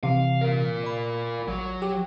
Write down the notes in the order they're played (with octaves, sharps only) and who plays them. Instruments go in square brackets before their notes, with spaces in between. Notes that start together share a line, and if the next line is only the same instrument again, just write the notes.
[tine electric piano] C3 E3 [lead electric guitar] F5
[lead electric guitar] F4 A#4
[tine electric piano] D5 B5
[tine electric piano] A1 [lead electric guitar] F#3
[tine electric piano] G4